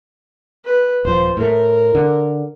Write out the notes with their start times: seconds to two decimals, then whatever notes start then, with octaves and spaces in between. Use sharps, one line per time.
0.64 B4
1.05 D#1 F3 C5
1.37 A2 A3 A#4
1.95 D3